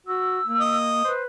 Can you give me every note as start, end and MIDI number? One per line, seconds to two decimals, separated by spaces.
0.07 0.40 66
0.07 0.78 88
0.46 1.01 58
0.60 1.11 75
1.05 1.26 71
1.05 1.23 72